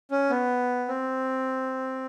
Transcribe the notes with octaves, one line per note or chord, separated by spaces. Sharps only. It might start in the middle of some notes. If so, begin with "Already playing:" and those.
C#4
B3
C4